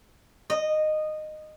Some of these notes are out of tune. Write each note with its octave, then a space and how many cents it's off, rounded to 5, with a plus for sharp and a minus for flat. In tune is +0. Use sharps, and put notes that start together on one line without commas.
D#5 -15